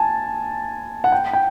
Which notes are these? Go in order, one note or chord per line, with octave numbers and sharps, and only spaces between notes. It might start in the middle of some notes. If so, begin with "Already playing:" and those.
Already playing: G#5 A5
F#5
G5
G5